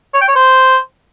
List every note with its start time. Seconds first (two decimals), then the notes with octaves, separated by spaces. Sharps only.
0.14 C#5
0.21 G5
0.28 C#5
0.36 C5